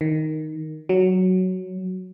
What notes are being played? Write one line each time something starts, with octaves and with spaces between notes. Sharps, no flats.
D#3
F#3